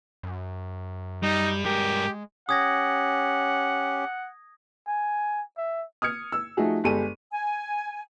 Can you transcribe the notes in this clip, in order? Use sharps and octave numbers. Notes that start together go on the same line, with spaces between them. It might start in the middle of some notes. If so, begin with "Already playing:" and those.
F#2
G3 D#4
G2 G#3 G4 A#4
C#4 G4 F#5 D#6 G#6 A#6
G#5
E5
D#6 F6 G#6 C#7
E6
F3 A3 D#4 F#4 G#4
G1 G#3 G4 A4 D#7
G#5